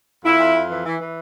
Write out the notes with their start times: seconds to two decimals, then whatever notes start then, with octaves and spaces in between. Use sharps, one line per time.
0.24 F2 E4
0.39 F2
0.54 F2
0.69 E3
0.84 E3
0.99 E3